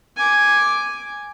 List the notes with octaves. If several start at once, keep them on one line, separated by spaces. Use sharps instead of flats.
G#5 D6